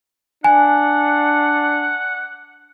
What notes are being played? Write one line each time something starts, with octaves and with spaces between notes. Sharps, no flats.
D4 F#5 G#5